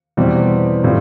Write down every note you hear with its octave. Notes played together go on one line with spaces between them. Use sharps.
E2 B2 G3 C4 G4
A2 G3 C4 F4